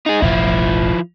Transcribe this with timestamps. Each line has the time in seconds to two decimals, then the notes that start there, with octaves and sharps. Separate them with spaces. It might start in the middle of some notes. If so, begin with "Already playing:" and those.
0.06 D#4 G#4
0.22 E1 A1 F3 E4